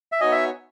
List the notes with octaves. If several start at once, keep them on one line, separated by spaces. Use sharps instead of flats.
E5
B3 D#4 F#4 C#5 D#5 G#5
E5